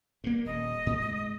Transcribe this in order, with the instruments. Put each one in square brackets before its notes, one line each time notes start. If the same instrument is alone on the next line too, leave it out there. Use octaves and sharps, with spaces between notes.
[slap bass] G2 A#3
[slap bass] D#1 [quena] D#5
[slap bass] G#2